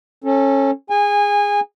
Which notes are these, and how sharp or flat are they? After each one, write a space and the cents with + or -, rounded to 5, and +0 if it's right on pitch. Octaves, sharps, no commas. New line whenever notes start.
C#4 -20 A4 +0
G#4 -15 G#5 -25